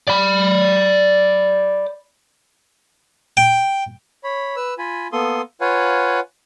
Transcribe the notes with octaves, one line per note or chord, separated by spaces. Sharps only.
D5 B5
G5
C#5 B5
B4 E6
F4 G#5 B5
A#3 B3 A4 C6 D#6
F4 B4 C#5 F5 F#5 G#5